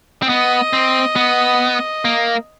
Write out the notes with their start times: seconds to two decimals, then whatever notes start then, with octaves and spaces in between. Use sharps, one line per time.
0.22 C4
0.29 B3 D#5
0.73 C4
1.16 B3
2.05 A#3